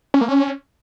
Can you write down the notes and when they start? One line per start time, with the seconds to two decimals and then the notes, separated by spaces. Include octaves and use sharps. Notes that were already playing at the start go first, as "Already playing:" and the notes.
0.14 C#4
0.21 A#3
0.28 C#4